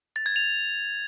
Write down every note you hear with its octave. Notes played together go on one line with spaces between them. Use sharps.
A6
G#6
F7